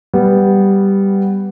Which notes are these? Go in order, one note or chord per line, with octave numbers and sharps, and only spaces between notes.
G3 B3